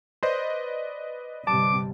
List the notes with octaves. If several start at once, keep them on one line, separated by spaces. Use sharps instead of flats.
B4 C5 D5 D#5
G1 C3 G3 A5 D6